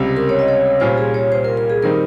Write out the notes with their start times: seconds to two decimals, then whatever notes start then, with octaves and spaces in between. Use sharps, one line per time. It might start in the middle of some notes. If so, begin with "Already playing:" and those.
Already playing: C#2 C3 G3
0.17 A#4
0.29 C#5
0.39 D#5
0.48 C#5
0.80 A#2 G3 C#4 F4 C5
0.98 G#4
1.14 C#5
1.32 C5
1.44 A#4
1.57 A#4
1.70 G#4
1.83 D#3 G3 C4 D#4 A#4